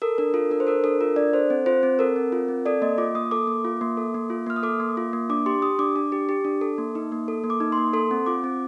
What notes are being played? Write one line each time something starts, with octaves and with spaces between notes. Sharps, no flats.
A4 A#4
D4 A#4
F4 A4
D4 A#4
C5
A4 A#4
D4 A4
F4 A#4
D4 D5
A4 C5
C4
F4 C5
C4
A4 A#4
C4
F4
C4
A4 D5
A#3 D#5
F4 D6
A#3 D#6
A4 D6
A#3
F4
A#3
A4
A#3
F4
A#3 F6
D#6
A4 D6
A#3
F4
A#3
D4 D6
G4 C6
G4 D#6
D4 D6
D4
G4
G4
D4
A4
A#3
D#4
A#3
A4
A#3
D6
D#4
C6
A#3
A4 C6
C4
F4 D6
C4